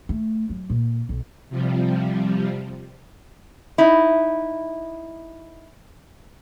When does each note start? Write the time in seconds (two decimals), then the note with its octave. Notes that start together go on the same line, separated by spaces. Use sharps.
0.09 A3
0.49 F#3
0.70 A#2
1.09 B1
1.49 C3 F3 G3
3.78 D#4 E4